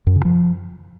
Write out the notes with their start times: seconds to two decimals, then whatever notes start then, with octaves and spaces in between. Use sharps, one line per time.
0.07 F#2
0.16 C#3
0.25 F3